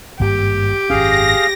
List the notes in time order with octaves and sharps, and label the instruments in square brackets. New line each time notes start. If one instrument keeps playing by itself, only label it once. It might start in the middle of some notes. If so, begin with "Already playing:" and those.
[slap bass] G#1 G2 A#3 [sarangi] G4
[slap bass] G#1 F#2 C#4 [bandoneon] G#4 F5 [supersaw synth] A#6